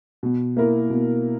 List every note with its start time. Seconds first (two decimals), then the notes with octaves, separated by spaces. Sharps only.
0.23 B2
0.57 A#3 E4 A#4
0.90 B2